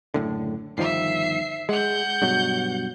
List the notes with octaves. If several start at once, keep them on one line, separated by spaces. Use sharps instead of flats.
F#1 A2 D3
G1 D#3 F3 E5 C7
G#3 F#5 G6
G2 B2 F#3